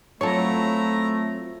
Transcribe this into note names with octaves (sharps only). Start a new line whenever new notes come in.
F#3 A3 C4 E4 F4 A4 C#5 A#5